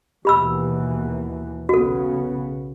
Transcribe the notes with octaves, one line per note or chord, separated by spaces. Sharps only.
D#2 B2 E3 G4 B5 E6
B1 C#3 B3 F#4 A4